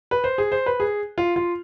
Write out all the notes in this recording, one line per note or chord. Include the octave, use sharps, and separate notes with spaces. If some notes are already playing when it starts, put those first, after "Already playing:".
B4
C5
G#4
C5
B4
G#4
F4
F4